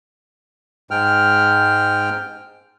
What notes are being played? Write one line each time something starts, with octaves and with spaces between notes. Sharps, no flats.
G#2 G#3 G5 F6